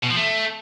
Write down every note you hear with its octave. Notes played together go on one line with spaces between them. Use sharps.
B2
F3
A3